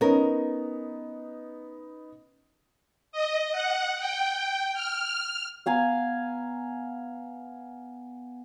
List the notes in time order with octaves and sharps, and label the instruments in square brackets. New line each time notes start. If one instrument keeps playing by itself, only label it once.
[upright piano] B3 D#4 [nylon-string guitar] C#4 A#4
[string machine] D#5
F#5
G5
F6
[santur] B3 F5 G#5 A#5